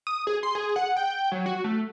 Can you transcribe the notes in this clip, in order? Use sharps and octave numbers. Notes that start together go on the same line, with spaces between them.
D#6
G#4
C6
G#4
F#5
G5
F#3
F#4
A3